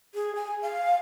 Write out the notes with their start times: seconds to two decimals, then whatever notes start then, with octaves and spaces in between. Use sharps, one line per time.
0.15 G#4
0.35 G#5
0.62 F5